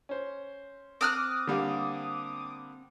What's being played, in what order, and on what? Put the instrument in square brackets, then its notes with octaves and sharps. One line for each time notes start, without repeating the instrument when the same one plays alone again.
[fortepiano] C#4 C5
[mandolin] C4 F6 F#6 [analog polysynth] D6 D#6
[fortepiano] D3 G3 A#3